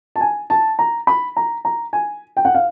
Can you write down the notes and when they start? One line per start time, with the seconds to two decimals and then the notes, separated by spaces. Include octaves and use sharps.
0.16 A5
0.21 G#5
0.50 A5
0.79 A#5
1.07 B5
1.37 A#5
1.65 A#5
1.93 G#5
2.37 G5
2.45 F#5
2.55 F5